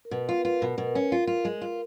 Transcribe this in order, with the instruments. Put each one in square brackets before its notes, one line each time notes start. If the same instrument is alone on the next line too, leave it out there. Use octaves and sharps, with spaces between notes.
[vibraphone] A#4
[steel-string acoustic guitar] B2 [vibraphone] B4
[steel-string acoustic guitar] F4
[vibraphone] B4
[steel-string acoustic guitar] F4
[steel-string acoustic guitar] B2 [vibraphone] A#4
[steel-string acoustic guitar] B2
[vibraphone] A#4
[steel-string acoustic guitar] C#4
[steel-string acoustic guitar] F4 [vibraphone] A#4
[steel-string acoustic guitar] F4
G#3
F4